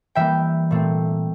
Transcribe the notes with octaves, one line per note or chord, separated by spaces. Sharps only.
E3 G3 A#3 E5 G5
A#2 A3 C4